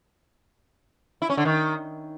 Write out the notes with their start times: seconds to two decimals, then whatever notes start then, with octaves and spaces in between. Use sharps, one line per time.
1.22 E4
1.30 C#4
1.37 D3
1.45 D#3